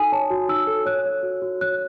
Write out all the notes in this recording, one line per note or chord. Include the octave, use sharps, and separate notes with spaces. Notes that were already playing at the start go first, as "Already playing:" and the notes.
Already playing: D#4 F#4 A4 G#5 D#6
C#5 A5
F#4
D#4 E6
A4
C#5 F#6
C#5
F#4
F#4
C#5 F#6